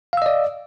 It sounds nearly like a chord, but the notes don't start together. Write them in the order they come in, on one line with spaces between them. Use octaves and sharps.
F5 E6 D#5 D5